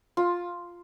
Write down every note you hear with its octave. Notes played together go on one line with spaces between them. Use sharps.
F4